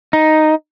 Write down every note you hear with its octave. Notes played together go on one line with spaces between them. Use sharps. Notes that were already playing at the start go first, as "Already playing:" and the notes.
D#4